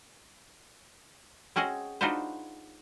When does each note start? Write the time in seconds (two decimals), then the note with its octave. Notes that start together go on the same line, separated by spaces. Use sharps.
1.56 C4 C#4 F#4 G#4 D#5
2.01 D4 D#4 F4 F#4 B4 C5